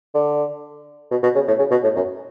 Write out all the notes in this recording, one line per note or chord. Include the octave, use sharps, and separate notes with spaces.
D3
B2
B2
C#3
A2
C#3
B2
A2
F#2